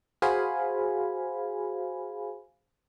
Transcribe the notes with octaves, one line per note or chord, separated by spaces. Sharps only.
F#4 G#4 C5 F5 G#5 B5